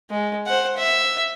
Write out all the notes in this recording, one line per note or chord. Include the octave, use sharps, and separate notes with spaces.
G#3
C5 F#5
E5